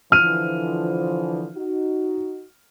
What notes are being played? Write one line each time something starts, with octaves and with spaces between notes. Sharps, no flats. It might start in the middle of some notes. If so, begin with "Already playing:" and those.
D3 E3 F3 F6 D#7
D#4 F#4